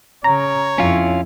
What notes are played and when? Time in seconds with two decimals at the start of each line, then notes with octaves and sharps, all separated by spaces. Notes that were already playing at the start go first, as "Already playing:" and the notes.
0.24 C#3 C#5 A#5
0.78 F2 C#4 E4 F4